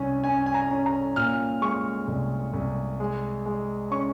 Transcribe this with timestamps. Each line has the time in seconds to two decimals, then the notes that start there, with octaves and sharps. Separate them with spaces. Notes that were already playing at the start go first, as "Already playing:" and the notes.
Already playing: C2 C#4 G#5
0.24 C#4 G#5
0.46 G#5
0.54 A#5
0.71 C#4
0.86 A#5
1.16 A#2 F6
1.62 G#3 C#6
2.08 C2
2.54 C2
3.00 G#3
3.46 G#3
3.91 C#4 C#6